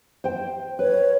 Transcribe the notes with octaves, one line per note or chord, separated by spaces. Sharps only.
C5 G5
B4 C#5